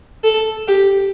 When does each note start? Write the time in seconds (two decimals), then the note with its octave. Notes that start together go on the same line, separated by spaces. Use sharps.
0.24 A4
0.68 G4